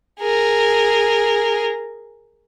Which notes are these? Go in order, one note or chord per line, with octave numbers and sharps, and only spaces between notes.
G#4 A#4